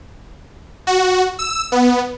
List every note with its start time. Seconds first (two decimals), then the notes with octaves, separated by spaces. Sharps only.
0.87 F#4
1.39 E6
1.72 B3